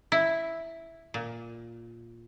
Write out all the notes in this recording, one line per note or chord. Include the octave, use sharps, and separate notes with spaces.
E4
A#2